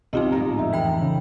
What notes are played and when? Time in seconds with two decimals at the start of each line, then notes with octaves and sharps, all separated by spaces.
0.13 B1 D#3 B3 C4 D#4 F4 G4 D#5
0.32 D1 G#2 A#5
0.58 F2 D#4 E5
0.73 E3 G5 B5
1.02 C#3